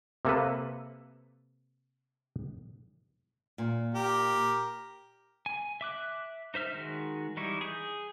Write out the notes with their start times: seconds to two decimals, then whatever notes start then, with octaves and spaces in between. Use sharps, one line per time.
0.25 C3 A#3 A4 B4
3.58 A#2
3.95 G4 A#4
5.46 G#5
5.81 E5 D6 F#6
6.54 D#4 C5 E5 F6
6.73 D#3 G#3 F#4
7.37 E3 G3 D#4 E4 C#6
7.61 G#4 G6